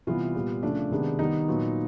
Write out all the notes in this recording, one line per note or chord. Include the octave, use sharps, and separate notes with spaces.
C3 E3 G3 B3 F4
A#2 G3 B3
C#3 F3 A3 D4
C3 D#3 G#3 B3
D#3 G3 B3 D#4
A#2 F#3 B3